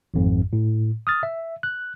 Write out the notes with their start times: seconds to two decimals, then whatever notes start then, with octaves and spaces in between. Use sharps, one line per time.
0.14 G#1 F2 G#2
0.53 A2
1.07 D#6 F6 A6
1.23 E5
1.63 F#6